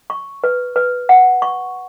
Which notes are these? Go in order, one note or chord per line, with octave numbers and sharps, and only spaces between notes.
C#6
B4
B4
F#5
C#6